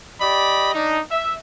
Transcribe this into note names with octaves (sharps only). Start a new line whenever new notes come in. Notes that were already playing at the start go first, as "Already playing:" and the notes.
G4 D5 D#5 B5
D4 D#4
E5